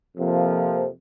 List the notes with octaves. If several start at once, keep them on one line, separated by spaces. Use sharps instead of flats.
F2 C3 F3 A#3